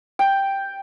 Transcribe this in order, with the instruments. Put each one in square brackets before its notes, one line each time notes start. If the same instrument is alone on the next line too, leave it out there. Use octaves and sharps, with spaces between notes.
[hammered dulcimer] G5